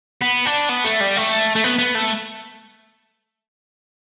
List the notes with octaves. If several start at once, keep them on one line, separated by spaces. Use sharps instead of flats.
B3
D4
B3
A3
G3
A3
A3
B3
B3
A3